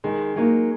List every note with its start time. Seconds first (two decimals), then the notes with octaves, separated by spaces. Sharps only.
0.04 D#3 G#3
0.36 F#3 A#3 D#4